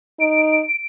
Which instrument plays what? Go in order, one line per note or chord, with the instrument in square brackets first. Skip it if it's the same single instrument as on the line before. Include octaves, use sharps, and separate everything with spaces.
[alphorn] D#4 [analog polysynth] D7